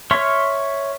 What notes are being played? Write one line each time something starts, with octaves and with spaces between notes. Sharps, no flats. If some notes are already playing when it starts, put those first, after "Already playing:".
C#5 E5 C6 C#6 F6